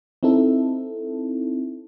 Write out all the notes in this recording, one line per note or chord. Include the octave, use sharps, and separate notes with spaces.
C4 D#4 E4 A4